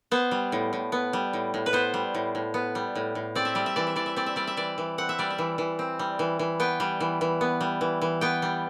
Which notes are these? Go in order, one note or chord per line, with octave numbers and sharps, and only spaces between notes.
B3 C5
G3
A2
A2
B3
G3
A2
A2
B4
B3 C5
G3
A2
A2
B3
G3
A2
A2
C4 D5
E5
G3 D5
E5
E3 D5
E5
E3 D5
E5
C4 D5
E5
G3 D5
E5
E3 D5
E3
C4 F#5
E5
G3 D5
E5
E3
E3
C4
G3
E3
E3
B3 G5
G3
E3
E3
B3
G3
E3
E3
B3 G5
G3